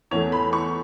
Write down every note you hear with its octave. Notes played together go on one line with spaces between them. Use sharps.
E2 E3 A3 C#5
B5
C#6